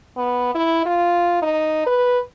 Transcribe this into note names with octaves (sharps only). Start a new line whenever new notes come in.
B3
E4
F4
D#4
B4